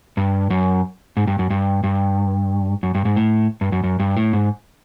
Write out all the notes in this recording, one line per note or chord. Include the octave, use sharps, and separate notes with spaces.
G2
F#2
G#2
G2
F#2
G2
G2
F#2
G2
G#2
A2
G2
F#2
F#2
G2
A2
G#2